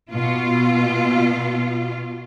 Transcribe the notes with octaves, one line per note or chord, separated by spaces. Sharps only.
B2 F4